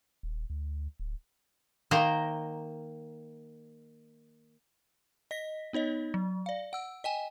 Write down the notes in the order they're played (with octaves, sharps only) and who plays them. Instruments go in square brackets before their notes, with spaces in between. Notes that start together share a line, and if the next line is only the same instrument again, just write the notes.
[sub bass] D#1
D2
D1
[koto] D#3 A#3 C5 A#5
[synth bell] D#5 A#6 B6
B3 D#4 C#5 D#5
F#3
D5 F5
F#5 E6
D#5 G5 G#5